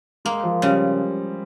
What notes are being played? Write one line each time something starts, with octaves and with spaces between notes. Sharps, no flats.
G#3 A#3
F3
C#3 G3